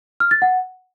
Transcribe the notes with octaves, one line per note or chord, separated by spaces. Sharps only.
F6
A6
F#5